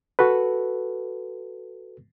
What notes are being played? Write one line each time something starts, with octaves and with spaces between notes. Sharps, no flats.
F#4 A4 B4